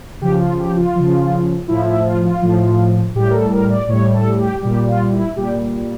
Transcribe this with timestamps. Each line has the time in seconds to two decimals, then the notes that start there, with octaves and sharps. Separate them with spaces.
0.22 C#3 F3 G4
0.40 F4
0.59 G4
0.76 F4
0.96 C#3 F3
1.68 A2 F3 E4
1.87 E4
2.05 F4
2.24 F4
2.42 A2 F3
3.15 A2 G3 G4
3.31 A#4
3.34 A4
3.52 A#4
3.70 D5
3.88 A2 G3 C#5
4.14 A4
4.38 G4
4.62 A#2 G3 G4
4.87 F4
5.12 E4
5.36 A#2 G3 G4